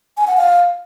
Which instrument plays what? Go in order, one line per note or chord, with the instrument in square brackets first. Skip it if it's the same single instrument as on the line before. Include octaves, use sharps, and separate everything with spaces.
[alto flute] G#5
F#5
F5